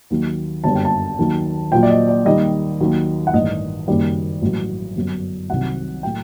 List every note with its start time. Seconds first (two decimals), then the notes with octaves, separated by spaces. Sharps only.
0.10 D#2 D#3 F#3
0.64 G1 F#2 D3 G3 A5
0.75 G5
0.85 A5
1.18 D#2 D#3 F#3
1.72 A#1 A#2 F#3 G5
1.83 D5
1.90 D#5
2.09 D5
2.25 D#2 D#3 G3 D#5
2.80 D#2 D#3 F#3
3.27 F#5
3.33 A1 G2 D#3 D#5
3.88 F#1 F#2 D#3 G3
4.42 A1 G2 F#3
4.96 G1 F#2 F#3
5.50 C2 C3 D#3 F#3 F#5
6.03 A2 F#3 G5